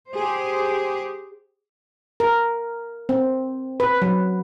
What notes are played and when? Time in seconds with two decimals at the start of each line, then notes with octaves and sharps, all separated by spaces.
0.12 G4 G#4 C5
2.20 A#4
3.09 C4
3.80 B4
4.02 F#3